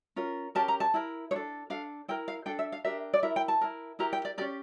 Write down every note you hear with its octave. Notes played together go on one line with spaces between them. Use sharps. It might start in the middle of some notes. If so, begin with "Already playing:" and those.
C#4 F4 A#4
C#4 G4 A#4 A5
A#5
A5
E4 A#4
D4 A4 C#5
D4 A4 F5
E4 A#4 G5
F5
D4 A4 G5
E5
F5
D4 G4 A#4 E5
D5
E4 A#4 E5
G5
A5
E4 A#4
E4 G4 A#4 A#5
G5
D5
C#4 G4 A#4 D5